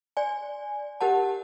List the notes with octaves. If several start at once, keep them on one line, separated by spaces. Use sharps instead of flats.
D5 G#5
G4 A#4 F#5 A5